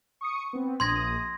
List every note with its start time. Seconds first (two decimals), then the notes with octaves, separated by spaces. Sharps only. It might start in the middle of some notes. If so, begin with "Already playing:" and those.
0.21 C#6 D#6 C#7
0.53 B3 C4
0.80 A#1 C6 D#6 G#6 A#6